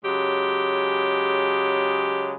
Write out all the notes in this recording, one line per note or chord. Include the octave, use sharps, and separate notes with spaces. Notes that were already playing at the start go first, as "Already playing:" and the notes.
C#3 F#3 G#3 G4